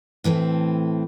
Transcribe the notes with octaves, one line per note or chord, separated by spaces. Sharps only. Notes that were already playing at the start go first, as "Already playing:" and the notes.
A2 E3 A3 C4